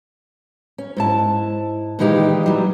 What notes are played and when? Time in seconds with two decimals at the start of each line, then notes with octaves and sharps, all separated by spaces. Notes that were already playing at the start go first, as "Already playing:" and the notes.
0.78 C#4
0.97 G#2 E4 A5
1.99 A#2 D#3 E3 G#3 D#4 G4
2.46 F#3 G3